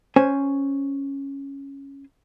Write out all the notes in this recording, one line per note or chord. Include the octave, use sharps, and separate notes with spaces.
C#4 C5 G#5